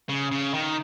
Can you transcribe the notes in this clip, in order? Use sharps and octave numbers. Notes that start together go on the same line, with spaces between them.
C#3
C#3
D#3